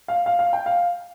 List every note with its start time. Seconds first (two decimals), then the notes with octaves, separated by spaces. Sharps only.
0.08 F5
0.26 F5
0.39 F5
0.53 G5
0.66 F5